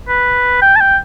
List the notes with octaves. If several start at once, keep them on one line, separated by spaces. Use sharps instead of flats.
B4
G5
A5
G5